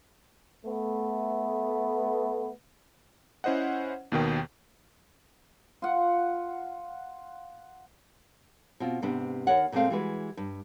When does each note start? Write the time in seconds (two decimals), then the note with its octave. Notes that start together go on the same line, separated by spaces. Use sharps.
0.65 A3 B3
3.44 C#4 E4 C5 D#5 F#5
4.12 D#2 B2 D#3 G5
5.82 F4 F#5
8.80 B2 C4 F4
9.02 G#2 C3 B3 D4
9.47 D#2 A#4 C#5 F#5
9.72 A#2 D3 G#3 A3 C4 F5
9.90 E3 G3 G#3 F#4 B4
10.37 G2